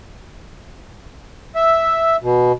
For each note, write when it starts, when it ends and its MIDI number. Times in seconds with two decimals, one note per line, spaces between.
1.55 2.16 76
2.23 2.52 47